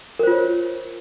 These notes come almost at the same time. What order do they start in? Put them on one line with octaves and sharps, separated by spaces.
A#4 C5 F4 C#5